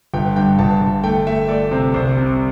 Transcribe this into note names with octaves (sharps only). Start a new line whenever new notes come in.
G1 G5
G2 G5
G1 A5
G1
A3 G5
A3 E5
A3 D5
C3 C5
C2 C5
C3